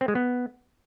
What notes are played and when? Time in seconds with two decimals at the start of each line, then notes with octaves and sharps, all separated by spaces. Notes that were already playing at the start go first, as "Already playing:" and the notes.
0.01 C4
0.08 G#3
0.15 B3